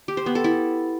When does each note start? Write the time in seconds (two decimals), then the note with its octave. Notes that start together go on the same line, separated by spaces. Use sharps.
0.08 G4
0.17 C5
0.26 B3
0.35 A4
0.44 E4